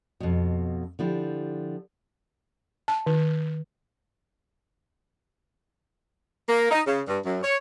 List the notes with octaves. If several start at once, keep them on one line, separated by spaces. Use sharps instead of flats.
F2 B2
D3 F3 E4 G4
A5
D#3
A#3
D#4
C#3
G2
F#2
C#5